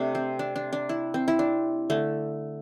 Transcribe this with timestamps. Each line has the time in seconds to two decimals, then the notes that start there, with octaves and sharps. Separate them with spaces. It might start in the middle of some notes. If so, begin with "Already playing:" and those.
Already playing: C3 A3 D4
0.15 C4
0.39 D4
0.56 D4
0.73 D4
0.89 E4
1.14 C4
1.28 E4
1.39 D4
1.90 D3 A3